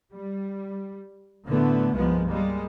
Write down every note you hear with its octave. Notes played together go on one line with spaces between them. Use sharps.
G3
A2 D3 A3 B3
C2 G2 F3 G#3 A#3 B3
G3 G#3 A#3